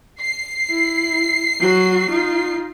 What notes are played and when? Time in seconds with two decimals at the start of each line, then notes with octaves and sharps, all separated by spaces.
0.21 C7
0.70 E4
1.59 F#3 F#4
2.10 D#4 F4